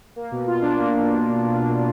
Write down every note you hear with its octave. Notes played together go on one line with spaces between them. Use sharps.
A#3
B2
F4
D4
A#3